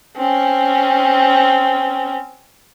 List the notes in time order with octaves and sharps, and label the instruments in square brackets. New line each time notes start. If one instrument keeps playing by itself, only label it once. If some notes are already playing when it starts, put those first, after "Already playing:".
[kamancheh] C4 C#4